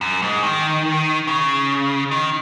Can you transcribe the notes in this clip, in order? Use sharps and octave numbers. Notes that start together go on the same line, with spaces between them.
F#2
G#2
D#3
C#3
D#3